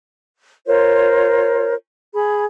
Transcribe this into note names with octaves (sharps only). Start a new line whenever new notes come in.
F4 A#4 C5 C#5
G#4 B5